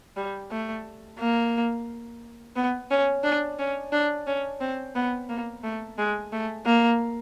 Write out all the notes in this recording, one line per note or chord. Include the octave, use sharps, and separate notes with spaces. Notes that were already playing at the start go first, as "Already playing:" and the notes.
G3
A3
A#3
B3
C#4
D4
C#4
D4
C#4
C4
B3
A#3
A3
G#3
A3
A#3